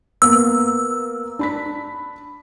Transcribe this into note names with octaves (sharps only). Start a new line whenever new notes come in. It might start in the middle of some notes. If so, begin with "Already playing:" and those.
A#3 B3 E6
D4 B5 B6